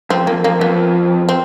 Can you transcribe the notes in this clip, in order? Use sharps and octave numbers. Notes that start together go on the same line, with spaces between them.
F2 C4
F2 A#3
F2 A#3
F2 B3
C4